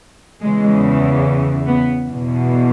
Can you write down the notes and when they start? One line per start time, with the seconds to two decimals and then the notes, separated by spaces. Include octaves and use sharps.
0.43 E2 C#3 E3 G#3
1.67 B3
2.09 E2 B2